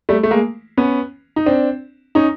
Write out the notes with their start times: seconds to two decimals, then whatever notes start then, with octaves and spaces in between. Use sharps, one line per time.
0.09 G3 A3
0.23 A3
0.31 G#3 A#3
0.77 B3 C#4
1.36 D#4
1.46 C4 D4
2.15 C#4 D#4